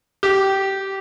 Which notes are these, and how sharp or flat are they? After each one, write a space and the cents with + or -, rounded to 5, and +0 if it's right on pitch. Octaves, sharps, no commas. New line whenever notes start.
G4 -15